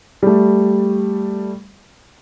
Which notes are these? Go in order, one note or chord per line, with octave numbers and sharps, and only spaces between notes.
G3 A3